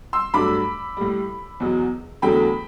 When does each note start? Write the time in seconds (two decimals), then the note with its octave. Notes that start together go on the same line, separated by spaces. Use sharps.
0.13 C6 E6
0.34 G2 F#3 A3 B5 D6
0.97 A2 G3
1.60 E2 B2 F#3
2.22 E2 D3 F#3 A3 G5 B5